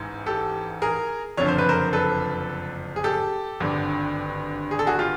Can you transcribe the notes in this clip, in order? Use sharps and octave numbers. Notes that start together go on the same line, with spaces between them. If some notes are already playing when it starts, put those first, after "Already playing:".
Already playing: A1 G#2 E3
G4 A4
G#4 A#4
F#1 F2 D3 F3 C#5
C5
B4
A#4 C5
A4 B4
G#4
G4 A4
G#1 G2 D3
G#4
A4
F#4 G#4
F4 G4